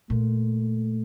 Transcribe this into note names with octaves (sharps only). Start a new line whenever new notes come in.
A#2 A3